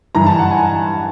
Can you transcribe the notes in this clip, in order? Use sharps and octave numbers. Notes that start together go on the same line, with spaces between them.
G2 E3 A#5
A5
F#5
G#5